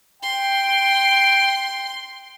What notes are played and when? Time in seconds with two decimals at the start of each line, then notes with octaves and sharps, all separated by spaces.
0.22 G5 C6